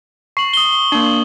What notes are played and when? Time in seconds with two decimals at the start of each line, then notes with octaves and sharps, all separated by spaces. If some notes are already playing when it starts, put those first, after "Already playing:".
0.37 C#6 C7 F#7
0.54 D#6 G7
0.92 A#3 D4